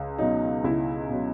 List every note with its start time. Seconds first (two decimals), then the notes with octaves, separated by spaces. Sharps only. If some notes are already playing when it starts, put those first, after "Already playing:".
Already playing: C#2
0.18 B2 F#3 D#4
0.64 C#2 E4
1.10 B2 F#3